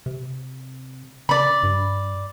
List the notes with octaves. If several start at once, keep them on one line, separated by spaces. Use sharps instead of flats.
C3
C#3 D5 B5
G2